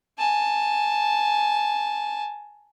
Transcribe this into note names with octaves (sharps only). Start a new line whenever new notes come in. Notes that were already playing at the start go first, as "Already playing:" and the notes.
G#5 A5